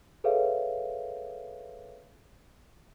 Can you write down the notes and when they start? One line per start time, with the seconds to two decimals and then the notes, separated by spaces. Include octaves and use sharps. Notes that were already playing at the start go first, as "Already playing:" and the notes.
0.24 G#4 A4 B4 C#5 E5 F5